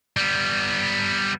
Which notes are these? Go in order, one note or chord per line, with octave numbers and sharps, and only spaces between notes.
G3 B3